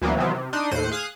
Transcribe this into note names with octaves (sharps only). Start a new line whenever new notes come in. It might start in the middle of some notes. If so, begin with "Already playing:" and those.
D2 E3 F#3 A#3 B3
C3 D#3 E3 F#3 B3 C4
C3
D4 D#4 C6 D#6
D#2 A2 C5 F#6 C#7 D#7
G#4 F5 D#6 F#6